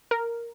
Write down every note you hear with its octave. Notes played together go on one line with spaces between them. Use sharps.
A#4